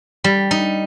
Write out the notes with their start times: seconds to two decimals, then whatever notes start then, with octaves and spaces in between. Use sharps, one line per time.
0.24 G3
0.51 D#4